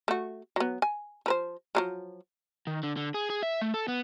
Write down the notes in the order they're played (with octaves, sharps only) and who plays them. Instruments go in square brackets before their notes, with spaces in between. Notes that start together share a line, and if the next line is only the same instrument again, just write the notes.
[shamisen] A3 F#4
F#3 B3
G#5
F3 B4 C5
F3 F#3 G#3
[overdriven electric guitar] D#3
D3
D3
G#4
G#4
E5
A3
A4
B3